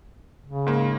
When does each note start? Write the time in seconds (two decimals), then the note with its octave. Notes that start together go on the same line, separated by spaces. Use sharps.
0.46 C#3
0.67 G#2 A#3